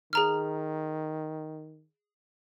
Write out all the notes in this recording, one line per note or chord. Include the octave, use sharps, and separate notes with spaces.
D#3 G#4 A#5 F6